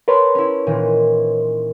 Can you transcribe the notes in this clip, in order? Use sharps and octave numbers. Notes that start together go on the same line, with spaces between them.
A#4 B4 C#5 A5 B5 C6
C#4 E4
A#2 D#3 E3